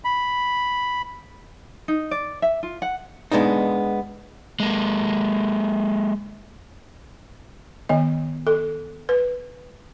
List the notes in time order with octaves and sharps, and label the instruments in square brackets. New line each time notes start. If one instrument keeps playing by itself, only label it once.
[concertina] B5
[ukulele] D#4
D5
E5
F4
F#5
[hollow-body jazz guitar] G#3 B3 D4 D#4
[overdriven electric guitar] G#3 A#3
[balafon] D#3 B3 D#5
A4
B4